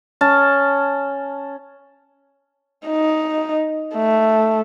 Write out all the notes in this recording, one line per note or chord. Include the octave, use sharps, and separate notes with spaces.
C#4 A5
D#4
A3